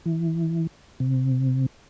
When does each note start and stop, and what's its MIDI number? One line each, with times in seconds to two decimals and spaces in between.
0.06 0.67 52
1.00 1.66 48